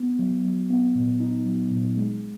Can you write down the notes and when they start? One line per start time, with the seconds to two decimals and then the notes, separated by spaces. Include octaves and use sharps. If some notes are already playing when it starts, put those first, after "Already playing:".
Already playing: B3
0.19 F#3
0.45 F#3
0.70 B3
0.95 A#2
1.20 D#4
1.45 F#3
1.71 A#2
1.96 G#3